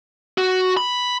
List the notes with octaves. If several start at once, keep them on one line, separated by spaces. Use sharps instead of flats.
F#4
B5